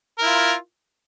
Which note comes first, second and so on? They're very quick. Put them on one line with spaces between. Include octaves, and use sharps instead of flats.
A#4 E4 F4